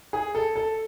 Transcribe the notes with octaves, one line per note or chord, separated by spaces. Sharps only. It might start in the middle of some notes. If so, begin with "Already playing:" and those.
G#4
A4
A4